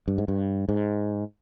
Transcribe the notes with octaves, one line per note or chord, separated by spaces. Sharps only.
G2
G#2
G2
G#2